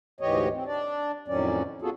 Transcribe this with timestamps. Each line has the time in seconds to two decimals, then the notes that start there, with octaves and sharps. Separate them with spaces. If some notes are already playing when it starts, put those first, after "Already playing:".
0.21 D2 G#2 E3 G4 C#5 D#5
0.52 C4
0.66 D4 D5
1.28 F2 A2 D#3 F#3 C#4 D5
1.82 B3 F4 F#4 G#4 A4